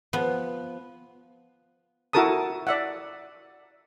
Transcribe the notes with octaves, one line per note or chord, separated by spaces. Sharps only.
F3 B3
E4 F#4 A4 A#4 A5 D#6
D5 E5 F#5